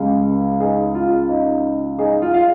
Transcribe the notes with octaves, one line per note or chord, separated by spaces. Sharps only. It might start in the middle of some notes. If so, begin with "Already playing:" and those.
Already playing: C#2 C#3 G#3
D#4 G#4
F4
D#4
D#4 G#4
F4
F5